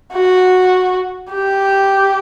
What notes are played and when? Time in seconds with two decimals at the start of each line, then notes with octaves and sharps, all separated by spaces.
0.13 F#4
1.31 G4